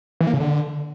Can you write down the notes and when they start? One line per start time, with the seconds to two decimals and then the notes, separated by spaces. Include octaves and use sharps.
0.21 E3
0.27 A#3
0.34 C#3
0.40 D3